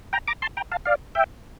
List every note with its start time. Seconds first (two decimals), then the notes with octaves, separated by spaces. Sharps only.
0.13 G5 A#5
0.28 A#5 D6
0.42 A5 C6
0.57 G5 A#5
0.72 F5 A5
0.85 D5 F5
1.15 E5 G5